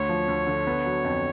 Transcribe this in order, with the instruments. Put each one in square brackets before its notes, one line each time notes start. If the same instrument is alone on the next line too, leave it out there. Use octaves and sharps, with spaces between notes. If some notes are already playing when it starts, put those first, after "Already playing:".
Already playing: [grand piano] D2 [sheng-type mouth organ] C#5
[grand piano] F3
D2
D3
B3
F#3
F2